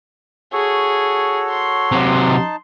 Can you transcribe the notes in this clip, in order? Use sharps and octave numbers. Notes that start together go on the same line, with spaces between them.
F#4 G#4 A4 C#5
C6
C3 F#3
D#4 A5